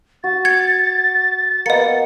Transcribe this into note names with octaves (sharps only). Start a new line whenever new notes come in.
F#4 A6
G#6 C#7
A#3 B3 D#5 C#7